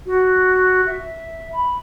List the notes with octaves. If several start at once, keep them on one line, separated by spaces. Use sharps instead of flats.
F#4
E5
B5